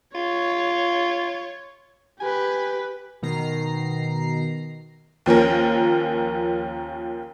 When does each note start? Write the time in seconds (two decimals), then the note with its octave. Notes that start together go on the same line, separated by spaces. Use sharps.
0.15 F4 C#5
2.20 G4 B4 G#5
3.22 B2 D#3 A#5 C7
5.26 D#2 F3 C#4 A#4